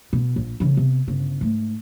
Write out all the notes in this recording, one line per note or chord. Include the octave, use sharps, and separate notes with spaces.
B2
A#1
C#3 E3
C3 B3
G1 C#3
G#2 A3